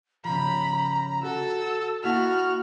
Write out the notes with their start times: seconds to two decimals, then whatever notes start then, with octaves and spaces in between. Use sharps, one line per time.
0.25 C#3 F3 A#5 B5
1.23 F#4 A4 E6
2.03 A#3 E4 F#4 A5 F6